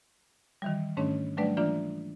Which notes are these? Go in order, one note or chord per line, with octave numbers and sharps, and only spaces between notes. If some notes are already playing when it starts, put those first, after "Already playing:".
D#3 E3 G3
G#2 D#3 A3 C#4 D4 C#5
F#3 G3 A3 D4 B4 D5
E3 A#3 D4 F4 D5